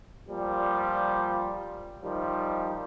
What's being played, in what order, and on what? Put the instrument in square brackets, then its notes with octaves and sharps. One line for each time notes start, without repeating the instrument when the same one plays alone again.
[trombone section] A#2 F3 G3
D#3 F3 G3